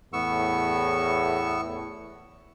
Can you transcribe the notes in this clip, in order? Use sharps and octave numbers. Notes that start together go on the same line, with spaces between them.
E2 A2 B3 C#6 E6